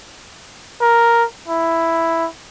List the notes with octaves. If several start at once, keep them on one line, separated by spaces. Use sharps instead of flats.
A#4
E4